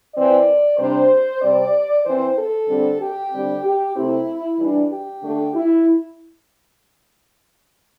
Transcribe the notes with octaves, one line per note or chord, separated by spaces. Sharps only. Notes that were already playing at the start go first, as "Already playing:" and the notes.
E3 C4 D5
C3 G3 D4 C5
C3 G3 C4 D5
E3 C4 C5
A4
D3 G3 C4
G4
D3 G3 C4
G4
C3 A3 C4 E4
E3 G3 D4
G4
D3 A3 D4
E4